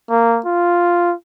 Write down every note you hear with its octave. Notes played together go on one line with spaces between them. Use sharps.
A#3
F4